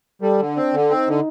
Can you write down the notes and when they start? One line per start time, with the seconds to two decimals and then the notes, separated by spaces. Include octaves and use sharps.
0.22 G3 A4
0.39 D3
0.56 C4 D4
0.73 D3
0.90 C4 D#4
1.08 D3